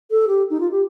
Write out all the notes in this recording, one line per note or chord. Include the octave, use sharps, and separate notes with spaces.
A4
G4
D#4
F4
G4